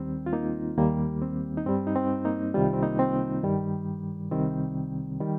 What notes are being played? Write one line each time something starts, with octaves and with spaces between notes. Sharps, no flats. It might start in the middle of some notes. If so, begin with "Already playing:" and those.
Already playing: D#2 D#3 G3 C4
F4
A#3 D#4
D#2 D#3 G3 A#3
C4
D#4
G2 G3 C4
D#4
C4
A#3 D#4
C2 C3 D#3 G3 F4
D#4
C4
A#3 D#4
C4
G2 D#3 G3
C2 C3 D#3 G3 C4
D#3 G3